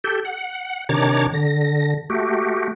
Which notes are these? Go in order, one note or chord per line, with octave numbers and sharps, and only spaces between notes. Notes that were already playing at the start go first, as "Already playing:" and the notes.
G4 A4 G6
F#5
C3 D#3 D4 C#5 A#5 D6
D3 A#6
A3 F#4 G4